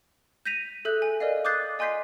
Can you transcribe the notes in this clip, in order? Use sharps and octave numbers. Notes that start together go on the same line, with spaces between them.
G6 A#6 B6 D#7 F7
G#4 A4 E5 F#6 G6
G#5
A#4 D5 D#5 F5
D6 D#6 F#6 G6 A6 C7
D#5 G#5 C6 G6 B6 C7